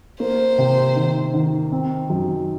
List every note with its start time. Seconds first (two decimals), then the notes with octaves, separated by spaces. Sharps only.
0.20 A#3 C5
0.58 C3
0.96 D#3
1.34 D#3
1.72 C4
2.10 F#2